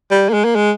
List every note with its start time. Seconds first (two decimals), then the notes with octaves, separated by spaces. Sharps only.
0.11 G3
0.29 A#3
0.33 G#3
0.45 A#3
0.56 G#3